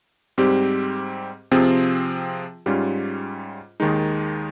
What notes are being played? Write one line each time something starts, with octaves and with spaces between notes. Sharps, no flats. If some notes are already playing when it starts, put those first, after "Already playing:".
G#2 G3 C4 G4
C3 F3 C4 F4 G#4
G#2 G3 C#4 F4
D#2 D#3 G#3 D#4